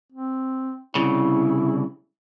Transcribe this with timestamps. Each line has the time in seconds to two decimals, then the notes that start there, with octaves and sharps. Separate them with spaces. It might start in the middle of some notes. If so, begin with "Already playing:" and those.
0.12 C4
0.95 C2 C#3 E4